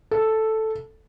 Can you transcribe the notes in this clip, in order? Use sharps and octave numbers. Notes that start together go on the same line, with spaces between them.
A4